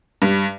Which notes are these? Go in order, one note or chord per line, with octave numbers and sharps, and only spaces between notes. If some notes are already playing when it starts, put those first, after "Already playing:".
G2